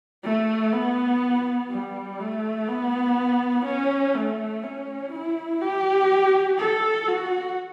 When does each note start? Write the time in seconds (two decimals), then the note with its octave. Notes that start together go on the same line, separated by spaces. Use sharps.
0.24 A3
0.73 B3
1.70 G3
2.20 A3
2.68 B3
3.65 C#4
4.15 A3
4.64 C#4
5.12 E4
5.61 G4
6.58 A4
7.08 F#4